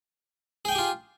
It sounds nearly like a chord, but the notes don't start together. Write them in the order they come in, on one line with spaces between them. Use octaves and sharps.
G#4 G5 G#5 G4 F4